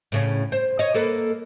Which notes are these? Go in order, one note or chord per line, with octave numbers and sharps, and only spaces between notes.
A2 C#3 C#4
C5
C#5 D#5
A#3 A4 B4